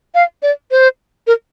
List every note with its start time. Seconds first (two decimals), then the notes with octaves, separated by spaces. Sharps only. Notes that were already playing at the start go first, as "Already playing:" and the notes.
0.15 F5
0.43 D5
0.71 C5
1.27 A#4